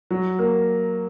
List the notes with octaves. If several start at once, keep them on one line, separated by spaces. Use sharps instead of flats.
F#3
A#3